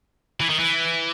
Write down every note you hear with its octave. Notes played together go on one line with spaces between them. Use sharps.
E3
D#3
E3